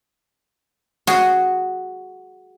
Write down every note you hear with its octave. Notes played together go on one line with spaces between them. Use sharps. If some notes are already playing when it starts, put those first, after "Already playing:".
F#4 G#4